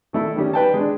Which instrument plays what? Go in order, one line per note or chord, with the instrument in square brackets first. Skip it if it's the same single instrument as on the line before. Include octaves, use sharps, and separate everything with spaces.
[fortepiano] D#3 A3 E4
D#3 G3 C#4
B4 G5 A5
G#3 D4